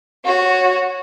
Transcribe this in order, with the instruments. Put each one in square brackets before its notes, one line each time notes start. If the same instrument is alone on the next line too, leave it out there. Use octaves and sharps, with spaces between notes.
[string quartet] F#4 C#5